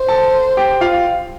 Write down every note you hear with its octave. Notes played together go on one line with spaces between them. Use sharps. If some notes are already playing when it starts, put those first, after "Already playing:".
Already playing: C5
A4 A5
G4 G5
F4 F5